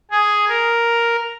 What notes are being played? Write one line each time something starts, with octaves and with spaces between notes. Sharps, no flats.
G#4
A#4